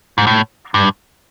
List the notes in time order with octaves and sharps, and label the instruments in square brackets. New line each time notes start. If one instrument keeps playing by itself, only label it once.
[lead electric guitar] G#2
A2
G2